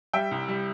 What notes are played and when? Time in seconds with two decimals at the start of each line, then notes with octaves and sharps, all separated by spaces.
0.13 G3 E5 G5
0.31 C2
0.48 G3